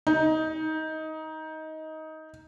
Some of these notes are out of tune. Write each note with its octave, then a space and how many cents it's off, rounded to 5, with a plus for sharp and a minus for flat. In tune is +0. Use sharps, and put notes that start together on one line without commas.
D#4 +15